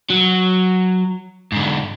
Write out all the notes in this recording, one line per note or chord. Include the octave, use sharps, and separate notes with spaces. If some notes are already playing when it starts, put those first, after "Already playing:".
F#3
G#2 D3